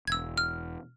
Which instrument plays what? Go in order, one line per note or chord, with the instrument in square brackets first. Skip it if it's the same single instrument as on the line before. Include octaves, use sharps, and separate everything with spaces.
[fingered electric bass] E1 [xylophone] E6 G#6
[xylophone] F6